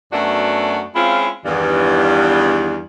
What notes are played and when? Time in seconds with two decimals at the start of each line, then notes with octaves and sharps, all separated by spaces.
0.13 F#2 A3 B3 D4 F#4 E5
0.95 G#3 C4 C#4 E4 F4
1.45 E2 G2 D#3